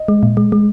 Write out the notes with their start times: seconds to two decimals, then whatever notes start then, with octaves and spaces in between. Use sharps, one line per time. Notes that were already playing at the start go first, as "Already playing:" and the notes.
Already playing: D#5
0.08 G#3
0.23 A#2
0.37 G#3
0.52 G#3